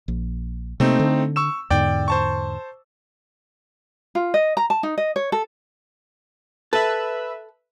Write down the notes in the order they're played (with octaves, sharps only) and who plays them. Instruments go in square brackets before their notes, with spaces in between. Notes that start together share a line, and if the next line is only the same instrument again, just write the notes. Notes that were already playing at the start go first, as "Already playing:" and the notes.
[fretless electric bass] A#1
[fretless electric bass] C3 A#3 [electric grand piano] A3 C4 D#4
[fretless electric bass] D3
[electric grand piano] C#6 E6 E7
[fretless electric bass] E2 G#2 D3 [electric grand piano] D5 G5
[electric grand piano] C5 A5 C#6
[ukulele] F4
D#5
A#5
A5
D#4
D#5
C#5
A4
[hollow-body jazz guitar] A4 [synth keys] B4 E5